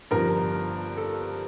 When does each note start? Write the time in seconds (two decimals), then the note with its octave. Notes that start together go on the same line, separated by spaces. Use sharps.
0.11 G1 G2 F3 A#4
0.97 A4